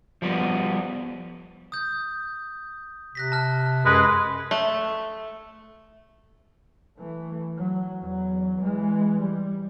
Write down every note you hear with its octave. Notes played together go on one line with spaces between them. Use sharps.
F3 G3 B3
D#6 G6
C3 F#6 A#6 B6
A5 F6
F#2 G#3 B4
A3
E3 A3
F#3
E2 F#3
E3 G#3
G3